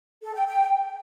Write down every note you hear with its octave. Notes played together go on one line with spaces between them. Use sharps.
A4
G5
G5